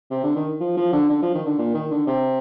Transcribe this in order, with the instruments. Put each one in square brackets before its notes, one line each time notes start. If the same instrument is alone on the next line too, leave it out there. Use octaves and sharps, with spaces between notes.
[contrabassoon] C3
D3
D#3
F3
F3
D3
D3
F3
D#3
D3
A#2
D#3
D3
C3